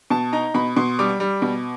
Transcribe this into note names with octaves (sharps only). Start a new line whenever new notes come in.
B2 A5
D#4 A#5
B2 B5
B2 C6
G3 D6
G3
B2